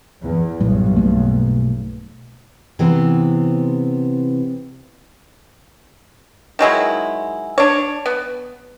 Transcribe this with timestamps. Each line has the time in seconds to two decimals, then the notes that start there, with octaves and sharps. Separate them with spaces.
0.20 E2
0.61 B1 G2 A#2 G3
0.95 B2 A3 A#3
2.79 C3 E3 B3 C4
6.59 D#3 F#3 G#3 E4
7.58 D4 C#5
8.06 B3